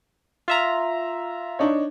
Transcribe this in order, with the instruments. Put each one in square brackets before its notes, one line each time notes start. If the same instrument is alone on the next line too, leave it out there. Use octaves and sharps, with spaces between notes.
[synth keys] F4 E5 A#5
[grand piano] D4 D#4 C#5